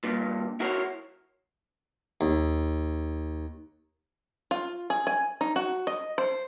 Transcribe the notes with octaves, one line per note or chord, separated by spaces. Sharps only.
G2 A#2
E4 F#4 A#4 C5 C#5
D#2
F4
G#4
G#5
D#4
F#4
D#5
C5